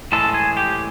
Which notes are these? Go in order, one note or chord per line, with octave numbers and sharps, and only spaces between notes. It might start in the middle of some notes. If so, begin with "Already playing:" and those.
A2 E3 G#3 A4
G#4
G4